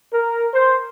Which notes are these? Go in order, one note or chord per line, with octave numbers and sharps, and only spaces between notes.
A#4
C5